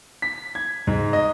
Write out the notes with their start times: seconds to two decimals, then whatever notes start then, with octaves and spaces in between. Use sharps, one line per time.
0.22 B6
0.55 G#6
0.87 G#2
1.13 D#5